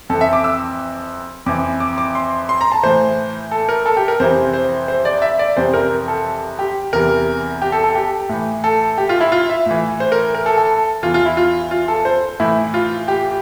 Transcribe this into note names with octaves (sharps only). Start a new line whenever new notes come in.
F2 E3 A4
E5
D6
E6
F2 E3 D6
D6
D6
C6
C6
A#5
A5
A2 E3 C5
A4
A#4
A4
G4
A#4
F2 C3 E3 C5
C5
C5
D5
E5
D5
F2 C3 E3 C5
A#4
A4
G4
E2 C3 E3 A#4
G4
A4
A4
G4
A2 E3
A4
G4
F4
E4
F4
E5
A2 E3
C5
A#4
A#4
A4
A4
E2 E3 F4
F4
E4
F4
F4
A4
C5
A2 E3 E4
F4
G4